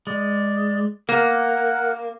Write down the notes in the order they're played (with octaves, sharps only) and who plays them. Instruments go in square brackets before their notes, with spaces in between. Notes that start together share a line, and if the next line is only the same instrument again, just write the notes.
[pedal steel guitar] G#3 [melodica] D5
[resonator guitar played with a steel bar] A#3 [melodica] A#4 F#5 [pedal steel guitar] D6